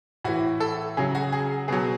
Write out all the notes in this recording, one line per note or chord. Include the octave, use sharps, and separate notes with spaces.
A2 E3 F#4
A4
C#3 F#3 G#4
F#4
G#4
B2 F#3 G#4